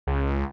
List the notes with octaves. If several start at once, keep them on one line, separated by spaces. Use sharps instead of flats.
C#2